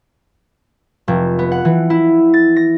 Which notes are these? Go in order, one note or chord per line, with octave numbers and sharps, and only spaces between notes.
F1
B3
F#5
E3
E4
A6
A#6